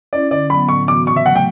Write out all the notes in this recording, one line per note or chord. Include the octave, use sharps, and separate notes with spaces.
C#4 E4 D5
D3 D5
F#3 B3 B5
A2 C#6
E3 B3 F#4 D6
C#3 C#6
E5
F#3 A3 F#5
G5